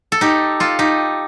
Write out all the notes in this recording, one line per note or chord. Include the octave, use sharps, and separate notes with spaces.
A4
D#4 G4
F4 A4
D#4 G4